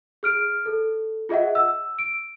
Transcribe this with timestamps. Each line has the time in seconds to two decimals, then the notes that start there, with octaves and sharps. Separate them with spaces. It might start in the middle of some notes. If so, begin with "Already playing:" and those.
0.23 G#4 F6 D7
0.66 A4
1.29 F4 G#4 D#5 E5 F#5
1.55 E6
1.99 D7